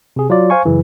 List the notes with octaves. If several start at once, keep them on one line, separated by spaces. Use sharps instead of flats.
C3 G#4
F#3 F4 D5
C5 F5 G#5 C#6
F#2 C#3 E3